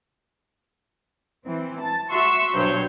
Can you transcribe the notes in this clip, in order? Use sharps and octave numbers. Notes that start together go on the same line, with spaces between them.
E3 C4
A5
F#4 E5 C6 C#6 E6
B1 G2 F#3 C5 C#5 G6